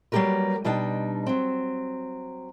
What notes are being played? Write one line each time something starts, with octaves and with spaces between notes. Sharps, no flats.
F#3 G3 A#3 G4 A#4 B4
B2 G3 D4 D#4 G5
F#3 C4